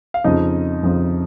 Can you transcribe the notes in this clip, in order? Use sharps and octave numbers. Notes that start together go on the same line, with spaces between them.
F5
F2 C#3 F3 D#4 D#5
F2 C#3 F3